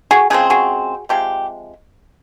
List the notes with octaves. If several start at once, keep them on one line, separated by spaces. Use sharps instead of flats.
F#4 G#4
C#3 F3 G#3 C4 G#4
F#4 G#4
C3 F3 G#3 G4